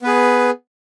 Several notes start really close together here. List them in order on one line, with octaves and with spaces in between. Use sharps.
B3 B4 G#4